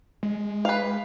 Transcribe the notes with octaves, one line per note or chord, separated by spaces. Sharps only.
G#3
B4 F5